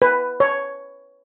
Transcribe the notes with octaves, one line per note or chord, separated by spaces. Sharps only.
B4
C#5